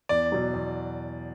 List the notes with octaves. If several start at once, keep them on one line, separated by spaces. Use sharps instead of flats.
E2 D5
B2 F#3
E2